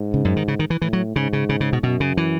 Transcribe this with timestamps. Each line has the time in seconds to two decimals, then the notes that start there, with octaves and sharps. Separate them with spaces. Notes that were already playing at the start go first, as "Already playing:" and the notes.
Already playing: G#2
0.14 C#3
0.25 F#2
0.36 D#3
0.48 C#3
0.59 D#3
0.70 E3
0.82 A2 E3
0.93 F#3
1.16 G#2 C#3
1.33 C#3
1.49 C#3
1.60 C#3
1.73 B2
1.83 F#2 B2
2.00 C#3
2.17 E3